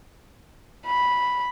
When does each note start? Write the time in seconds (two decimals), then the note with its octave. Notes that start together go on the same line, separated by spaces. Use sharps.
0.86 B5